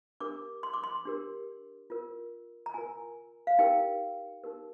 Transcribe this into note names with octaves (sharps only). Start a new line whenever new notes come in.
D4 G4 A#4 D6
C6
D6
C6
D4 G4 A#4
F4 A#4
A#5
F4 A#4 G#5
F5
D#4 G4 A#4 G5
D#4 G4 A#4